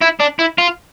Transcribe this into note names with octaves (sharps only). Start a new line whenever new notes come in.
E4
D4
E4
F4